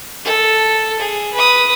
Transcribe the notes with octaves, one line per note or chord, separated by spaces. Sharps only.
A4
G#4
B4 D#6